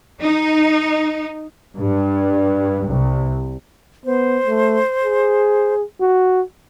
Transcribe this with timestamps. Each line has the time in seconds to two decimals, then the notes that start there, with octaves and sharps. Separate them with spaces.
0.20 D#4
1.79 G2
2.88 C2
4.05 B3 C5
4.47 A3
5.04 G#4
6.01 F#4